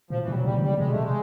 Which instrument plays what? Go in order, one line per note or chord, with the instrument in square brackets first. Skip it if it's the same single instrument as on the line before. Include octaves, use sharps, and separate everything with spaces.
[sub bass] A#2 [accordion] F3
[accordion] E3
[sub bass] B2 [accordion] G3
[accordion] F#3
[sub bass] C3 [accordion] G3
[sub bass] D#3
[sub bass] C#3 [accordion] G3
[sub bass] C3
[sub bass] B2 [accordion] G#3
[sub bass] C3 [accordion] A3
[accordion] G#3